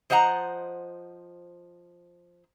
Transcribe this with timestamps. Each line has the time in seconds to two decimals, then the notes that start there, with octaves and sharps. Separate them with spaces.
0.10 F3 C5 D#5 F#5 A#5